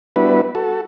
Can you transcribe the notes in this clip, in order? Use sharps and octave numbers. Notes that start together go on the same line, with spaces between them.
G3 B3 D4 E4 F#4 B4
F#4 A4